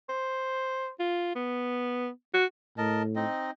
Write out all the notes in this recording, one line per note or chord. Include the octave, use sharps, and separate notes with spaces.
C5
F4
B3
F#4
A2 A#4 D#5 A5
C4 D#4 D#5